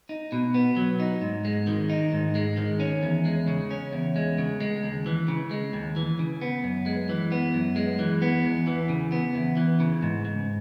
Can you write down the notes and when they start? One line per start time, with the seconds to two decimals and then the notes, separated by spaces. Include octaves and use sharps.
0.09 D#4
0.32 B2
0.54 B3
0.76 F#3
1.00 D#4
1.22 G#2
1.45 G#3
1.67 D#3
1.90 D#4
2.13 G#2
2.35 G#3
2.57 D#3
2.80 C#4
3.03 E2
3.25 G#3
3.48 C#3
3.71 C#4
3.93 E2
4.16 G#3
4.38 C#3
4.61 G#3
4.83 D#2
5.06 E3
5.28 C#3
5.51 G#3
5.73 D#2
5.96 E3
6.19 C#3
6.42 B3
6.64 F#2
6.86 G#3
7.09 E3
7.32 B3
7.54 F#2
7.76 G#3
7.99 E3
8.22 B3
8.44 E2
8.67 E3
8.89 C#3
9.12 B3
9.35 E2
9.57 E3
9.80 C#3
10.02 G#2
10.25 G#2